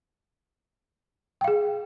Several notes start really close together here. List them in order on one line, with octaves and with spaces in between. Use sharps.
G5 F5 G#4